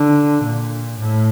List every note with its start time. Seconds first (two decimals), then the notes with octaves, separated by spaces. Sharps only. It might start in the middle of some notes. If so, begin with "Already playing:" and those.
Already playing: D3
0.43 A#2
0.99 A2